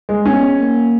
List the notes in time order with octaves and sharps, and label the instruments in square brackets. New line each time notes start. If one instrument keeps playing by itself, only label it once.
[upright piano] G#3
[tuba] B3 [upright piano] C#4
[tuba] A#3